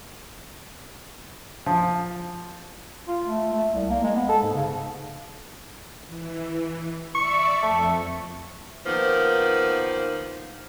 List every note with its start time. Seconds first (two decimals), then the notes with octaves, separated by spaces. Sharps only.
1.66 F3
3.08 F4
3.25 A3
3.53 A3
3.74 C2
3.90 A#3
4.03 G#3
4.16 B3
4.29 A4
4.43 G#2
4.54 C#3
6.07 E3
7.15 D5 E5 C#6
7.63 F2 A3
8.85 D#3 F3 A#3 B3